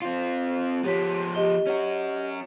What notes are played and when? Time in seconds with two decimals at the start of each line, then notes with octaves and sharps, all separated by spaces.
0.02 C4 F4
0.84 F3 B3 G4 C#5 B6
1.34 G4 D#5 G7
1.67 C#4 F#4